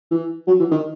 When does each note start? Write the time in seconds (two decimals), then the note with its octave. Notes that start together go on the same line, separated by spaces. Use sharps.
0.11 E3
0.47 F#3
0.60 E3
0.71 D#3